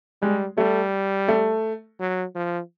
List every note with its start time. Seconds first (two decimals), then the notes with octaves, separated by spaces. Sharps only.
0.22 G3 G#3
0.58 G3 A3
1.28 A3
2.00 F#3
2.35 F3